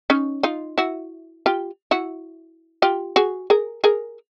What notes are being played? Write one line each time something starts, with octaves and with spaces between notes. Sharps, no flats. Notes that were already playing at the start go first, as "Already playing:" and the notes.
C#4 D#4
D#4 F4
E4 F#4
F4 G4
E4 F#4
F4 G4
F#4 G#4
G#4 A#4
G#4 A#4